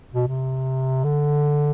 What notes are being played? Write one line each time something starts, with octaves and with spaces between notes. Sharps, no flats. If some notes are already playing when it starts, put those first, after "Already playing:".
B2
C3
D3